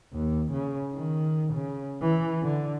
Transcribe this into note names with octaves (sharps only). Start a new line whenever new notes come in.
D#2
C#3
D#3
C#3
E3
D3